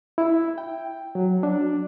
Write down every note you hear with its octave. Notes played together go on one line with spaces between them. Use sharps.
E4
G5
F#3
D4